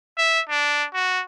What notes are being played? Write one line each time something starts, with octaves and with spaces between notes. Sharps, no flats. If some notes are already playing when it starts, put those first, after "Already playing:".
E5
D4
F#4